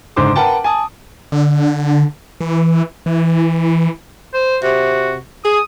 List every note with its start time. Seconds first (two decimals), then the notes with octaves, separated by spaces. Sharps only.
0.16 F#1 G#2 D3 C5 C6 D6
0.36 A#4 B4 F#5 G5 A5
0.64 G#5 A5 D#6
1.32 D3
2.41 E3
3.06 E3
4.34 C5
4.63 C3 F#4
5.45 G#4 D#6